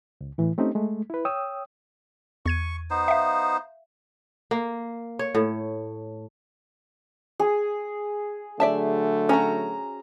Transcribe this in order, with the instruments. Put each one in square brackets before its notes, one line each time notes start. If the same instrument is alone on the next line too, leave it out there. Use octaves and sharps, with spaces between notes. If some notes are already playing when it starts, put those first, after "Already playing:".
[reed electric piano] C#2
A2 E3
A3 C4 C#4 D#4 G4
G#3 A3
E4 B4
C#5 G5 D#6 E6
[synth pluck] E2 G#6 D#7 [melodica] C#6
[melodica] B3 D#4 C5
[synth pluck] E5 F5
[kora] A#3
C#5
A2
[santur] G#4
[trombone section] D3 F#3 A3 [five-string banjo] D5 E5 A5
[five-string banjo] C#4 F#4 [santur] A#5